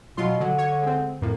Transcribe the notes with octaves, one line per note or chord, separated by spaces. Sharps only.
B2 F#3 F4 C6
D3 F#3
C#5
G#3 C4
F2 A2 A#3